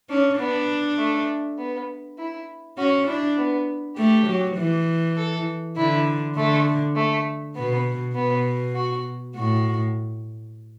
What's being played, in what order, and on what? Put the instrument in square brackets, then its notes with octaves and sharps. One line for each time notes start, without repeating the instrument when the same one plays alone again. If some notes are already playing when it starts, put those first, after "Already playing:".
[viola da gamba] C#4 [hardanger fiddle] D4
[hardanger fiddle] B3 [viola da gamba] D4
[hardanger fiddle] A3
B3
E4
[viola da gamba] C#4 [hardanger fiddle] F#4
[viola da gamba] D4 [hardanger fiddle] E4
[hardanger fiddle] B3
[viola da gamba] A3 [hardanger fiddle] G4
[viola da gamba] F#3
E3
[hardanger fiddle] A4
[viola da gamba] D3 [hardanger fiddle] E4
[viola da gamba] D3 [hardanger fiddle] A3
[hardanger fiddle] A3
[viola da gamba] B2 [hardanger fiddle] B3
[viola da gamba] B2 [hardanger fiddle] B3
[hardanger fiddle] F#4
[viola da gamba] A2 [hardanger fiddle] F#4